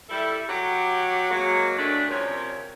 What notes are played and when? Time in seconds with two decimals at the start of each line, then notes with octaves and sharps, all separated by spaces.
0.09 G3 E4 A4
0.49 F#3 G4 F#5
1.30 F#3 G#3 A#3
1.78 A2 A3 C#4 D4
2.09 F2 C3 G3 C#4 A#4 C#5